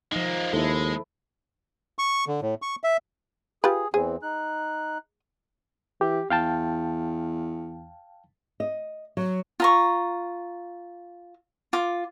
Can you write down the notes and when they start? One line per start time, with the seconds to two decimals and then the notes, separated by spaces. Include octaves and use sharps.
0.12 F3 G#3 A#3 D#4
0.53 D#2 G#3 E4 A4
1.99 C#6
2.27 D3
2.42 A2
2.62 C#6
2.84 E5
3.64 F4 G4 G#4 B4
3.94 E2 E3 C4 G#4
4.23 D#4 F#6
6.01 E3 G4
6.30 E2 F5 G5 A5
8.60 D#5
9.17 F#3
9.60 F4 A#5 C#6
11.73 F4 D6